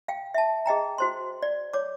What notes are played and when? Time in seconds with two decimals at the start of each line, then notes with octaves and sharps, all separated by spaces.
0.08 F5 G5
0.34 E5 A5
0.66 G#4 D#5 G5 A#5
0.98 F#4 C5 C6
1.42 D5
1.73 C#5 D6